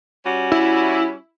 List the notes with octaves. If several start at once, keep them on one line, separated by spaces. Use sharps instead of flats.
G3 C#4 F#4
E4